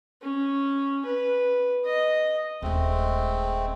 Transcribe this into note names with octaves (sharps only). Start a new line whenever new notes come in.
C#4
B4
D#5
D#1 G#3 A3 C4 D4